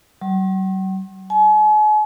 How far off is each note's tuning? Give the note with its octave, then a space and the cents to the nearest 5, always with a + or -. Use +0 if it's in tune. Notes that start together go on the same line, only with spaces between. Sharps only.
F#3 +45
G#5 +40